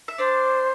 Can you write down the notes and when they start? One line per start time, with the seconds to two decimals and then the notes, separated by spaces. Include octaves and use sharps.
0.08 E5
0.18 D4 C5 D5